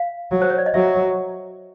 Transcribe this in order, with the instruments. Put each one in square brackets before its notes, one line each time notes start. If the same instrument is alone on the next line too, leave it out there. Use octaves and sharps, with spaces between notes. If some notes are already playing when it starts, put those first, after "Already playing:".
Already playing: [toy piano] F5
[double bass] F#3
[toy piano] C5
C#5
D5
D#5
[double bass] F#3 [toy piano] E5